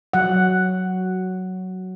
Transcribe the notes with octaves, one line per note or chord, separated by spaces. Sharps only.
F#3 F#5